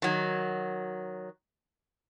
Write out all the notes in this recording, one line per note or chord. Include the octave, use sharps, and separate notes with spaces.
D#3 F#3